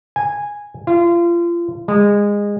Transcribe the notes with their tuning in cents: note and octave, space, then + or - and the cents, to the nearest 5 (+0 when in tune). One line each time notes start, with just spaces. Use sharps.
G#5 -10
F4 -30
G#3 -20